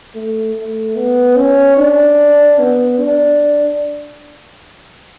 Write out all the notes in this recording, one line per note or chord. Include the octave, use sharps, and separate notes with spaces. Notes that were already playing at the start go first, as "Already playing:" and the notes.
A3
A3
B3
C#4
D4
B3
D4